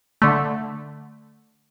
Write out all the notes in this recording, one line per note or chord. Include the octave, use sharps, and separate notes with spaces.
D3 A3